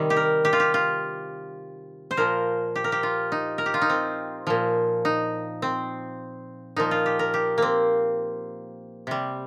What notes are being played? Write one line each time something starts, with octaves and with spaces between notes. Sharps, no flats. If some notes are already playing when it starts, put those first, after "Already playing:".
Already playing: C3 D#3 G3
G4
A#4
G4
F4
G4
F4
C5
A#2 F3 A#4
G4
A#4
G4
F4
D#4
A#4
G4
F4
D#4
C4
A#2 F3
D#4
C4
A#2 F3 D#4
F4
G4
A#4
G4
A#3 C4
C3 G3